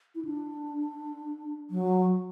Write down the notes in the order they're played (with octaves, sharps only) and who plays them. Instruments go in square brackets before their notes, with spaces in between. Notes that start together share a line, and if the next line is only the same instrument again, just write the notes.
[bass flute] E4
D4
F#3